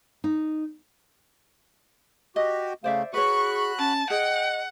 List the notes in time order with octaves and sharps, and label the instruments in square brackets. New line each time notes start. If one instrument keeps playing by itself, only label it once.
[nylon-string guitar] D#4
[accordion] F#4 G4 [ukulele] D#5
[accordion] C#3 A3 [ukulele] C5 D5 E5 [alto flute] F5
[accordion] F#4 B5 F#6 [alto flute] G#4 [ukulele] B4 C#5 [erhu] C#6
[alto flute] C#4 [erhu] A5
[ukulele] G#4 [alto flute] D#5 [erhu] F#5 [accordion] G5